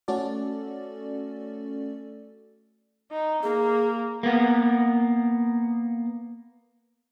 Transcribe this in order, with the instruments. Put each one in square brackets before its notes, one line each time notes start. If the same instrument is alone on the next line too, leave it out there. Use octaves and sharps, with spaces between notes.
[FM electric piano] A3 C#4 F#4 A4 D5
[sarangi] D#4
[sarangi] A#3 [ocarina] G#4
[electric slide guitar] A#3 B3